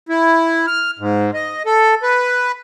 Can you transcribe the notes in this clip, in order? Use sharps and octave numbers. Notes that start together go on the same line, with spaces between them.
E4
F6
G#2
D#5
A4
B4